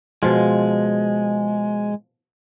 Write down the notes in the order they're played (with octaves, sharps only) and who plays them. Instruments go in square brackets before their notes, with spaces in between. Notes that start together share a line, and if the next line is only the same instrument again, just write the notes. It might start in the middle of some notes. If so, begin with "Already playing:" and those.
[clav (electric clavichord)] B2 F3 F4 [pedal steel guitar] G#3